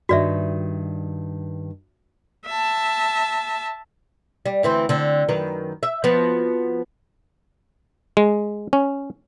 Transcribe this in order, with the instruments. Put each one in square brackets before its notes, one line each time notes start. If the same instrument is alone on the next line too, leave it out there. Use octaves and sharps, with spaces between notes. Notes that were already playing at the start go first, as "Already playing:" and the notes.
[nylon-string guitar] G2 D#3 [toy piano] F#4 D5 E5
[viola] E5 A5
[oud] G3
D2 E3 C4
D3 C4
F#2 D#3 B4
E5
F3 B3 F#4
[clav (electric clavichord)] G#3
C#4